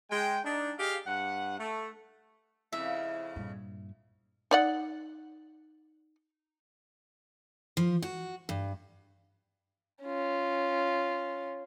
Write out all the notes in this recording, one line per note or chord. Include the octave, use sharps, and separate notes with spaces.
G#3 G5
D4 D#4
G4 G#4 D#5 F5
G2 F#5
A3
F2 C#3 E4 E5
G2 A#2
D#4 D5 F#5
F3
F#4
G2
C#4 F4